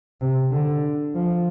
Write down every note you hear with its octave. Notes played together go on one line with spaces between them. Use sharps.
C3
D3
F3